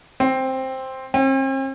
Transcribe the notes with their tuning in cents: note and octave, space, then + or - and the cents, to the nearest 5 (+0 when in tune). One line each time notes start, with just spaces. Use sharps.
C4 +5
C4 +45